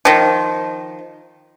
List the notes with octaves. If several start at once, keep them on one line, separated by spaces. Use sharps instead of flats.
D#3 F3